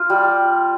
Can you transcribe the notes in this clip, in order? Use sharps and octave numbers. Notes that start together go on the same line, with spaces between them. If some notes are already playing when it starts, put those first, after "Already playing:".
Already playing: F4
G3